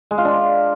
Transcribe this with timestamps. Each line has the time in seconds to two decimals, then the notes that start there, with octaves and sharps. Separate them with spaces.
0.11 G#3
0.18 F4
0.25 D4